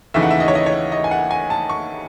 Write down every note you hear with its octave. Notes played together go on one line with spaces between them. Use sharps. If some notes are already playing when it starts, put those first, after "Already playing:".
D#2 C#3 E3 A3 D#4 E5
F#5
E5
D#5
C#5
D#5
C#5
D#5
G#5
F#5
G#5
A5
C#6